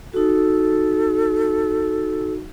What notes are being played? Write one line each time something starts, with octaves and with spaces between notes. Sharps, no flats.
D#4 F#4 A4